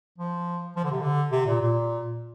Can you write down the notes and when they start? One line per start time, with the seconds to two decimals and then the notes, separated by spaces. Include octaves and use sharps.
0.18 F3
0.76 F3
0.84 D3
0.91 C3
1.01 D3
1.31 C3
1.46 A#2
1.61 A#2